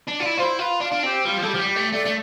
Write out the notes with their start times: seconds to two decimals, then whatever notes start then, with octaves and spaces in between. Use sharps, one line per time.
0.08 D4
0.14 D5
0.20 F4
0.26 E4
0.37 F4 C5
0.42 E4
0.58 F4 B4
0.80 D4 F4
0.92 D4
1.03 C4 G4
1.25 G3 F4
1.38 F3
1.42 G3 A4
1.48 G4
1.54 F3
1.59 G3
1.70 G4
1.76 A3
1.92 A3 D5
2.05 A3